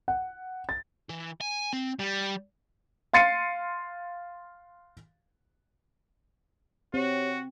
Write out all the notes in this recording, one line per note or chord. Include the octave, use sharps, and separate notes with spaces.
F#5
A6
E3
G#5
C4
G3
F5 C6 A6 C7 C#7 D#7
C4 F#4 G4 C#5